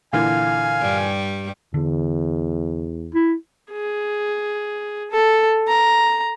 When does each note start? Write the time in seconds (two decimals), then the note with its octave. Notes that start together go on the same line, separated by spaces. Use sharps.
0.13 A#2 D3 E3 F5 G#5
0.81 G2 G3
1.74 E2 D3
3.15 E4
3.72 G#4
5.11 A4
5.68 A#5